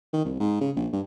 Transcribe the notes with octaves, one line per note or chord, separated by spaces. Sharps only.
D#3
C2
G#2
C#3
A#1
G2